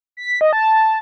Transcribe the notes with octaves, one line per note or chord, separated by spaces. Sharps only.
B6
D#5
A5